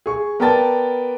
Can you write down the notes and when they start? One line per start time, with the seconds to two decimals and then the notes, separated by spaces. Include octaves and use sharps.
0.06 G#4 C#6
0.40 B3 A#4 D5 G5 A5 A6